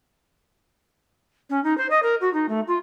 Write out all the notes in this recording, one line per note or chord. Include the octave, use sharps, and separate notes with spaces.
C#4
D#4
C5
D#5
A#4
F#4
D#4
A3
F4